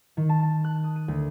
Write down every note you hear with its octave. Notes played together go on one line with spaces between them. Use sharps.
D#3
A5
A5
F#6
D#6
D#7
D2